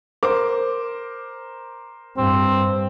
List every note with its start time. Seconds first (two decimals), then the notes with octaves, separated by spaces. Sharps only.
0.23 A#4 C5 D6
2.18 G2 C4